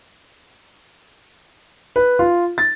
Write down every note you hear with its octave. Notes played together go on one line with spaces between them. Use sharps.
B4
F4
A6